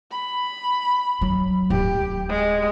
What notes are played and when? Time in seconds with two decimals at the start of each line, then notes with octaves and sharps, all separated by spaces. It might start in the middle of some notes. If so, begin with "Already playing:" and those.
0.12 B5
1.21 F#3
1.70 D1 G4
2.29 G#3